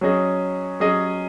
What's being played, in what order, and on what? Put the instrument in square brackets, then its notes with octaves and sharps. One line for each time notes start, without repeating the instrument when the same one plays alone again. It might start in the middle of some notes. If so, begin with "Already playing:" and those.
[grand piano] F#3 C#4 G#4 D#5
F#3 C#4 G#4 D#5